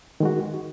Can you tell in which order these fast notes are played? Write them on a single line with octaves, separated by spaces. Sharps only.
D#3 G#3 F#4